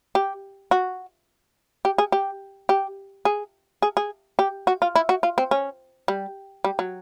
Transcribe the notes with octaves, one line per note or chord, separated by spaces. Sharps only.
G4
F#4
G4
G#4
G4
G4
G#4
G#4
G#4
G4
F#4
F4
E4
F#4
F4
C4
C#4
G3
G3
F#3